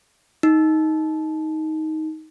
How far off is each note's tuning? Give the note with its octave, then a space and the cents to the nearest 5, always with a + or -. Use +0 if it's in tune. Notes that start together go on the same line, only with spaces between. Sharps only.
D#4 +15